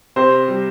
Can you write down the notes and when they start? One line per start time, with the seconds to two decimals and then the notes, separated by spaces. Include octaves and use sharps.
0.16 C3 C4 C5
0.48 G3